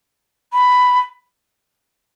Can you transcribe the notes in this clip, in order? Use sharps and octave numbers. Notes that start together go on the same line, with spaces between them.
B5